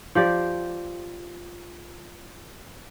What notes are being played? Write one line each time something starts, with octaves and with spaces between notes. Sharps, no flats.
F3 G4 D5